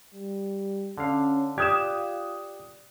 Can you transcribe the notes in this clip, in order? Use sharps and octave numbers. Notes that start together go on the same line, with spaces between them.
G3
D3 C#4 F5
F4 G4 D5 D#6 F#6 G#6 E7